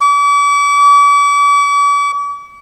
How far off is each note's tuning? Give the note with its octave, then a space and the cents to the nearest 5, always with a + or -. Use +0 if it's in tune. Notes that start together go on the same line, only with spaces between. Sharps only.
D6 -45